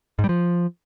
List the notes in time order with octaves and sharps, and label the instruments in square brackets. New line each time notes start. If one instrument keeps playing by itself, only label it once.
[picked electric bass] G#2
G3
F3